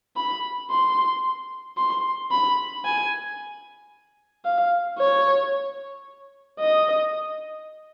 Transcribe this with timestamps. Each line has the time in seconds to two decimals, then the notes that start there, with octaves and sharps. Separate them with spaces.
0.17 B5
0.70 C6
1.77 C6
2.31 B5
2.85 G#5
4.45 F5
4.99 C#5
6.60 D#5